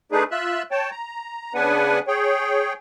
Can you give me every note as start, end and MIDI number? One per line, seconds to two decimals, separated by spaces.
0.12 0.24 57
0.12 0.24 62
0.12 0.24 63
0.12 0.24 68
0.12 0.24 71
0.31 0.63 65
0.31 0.63 76
0.31 0.63 88
0.31 0.63 90
0.71 0.90 73
0.71 0.90 79
0.71 0.90 81
0.91 1.53 82
1.55 1.99 49
1.55 1.99 59
1.55 1.99 62
1.55 1.99 71
1.55 1.99 78
1.55 1.99 80
2.08 2.73 68
2.08 2.73 73
2.08 2.73 79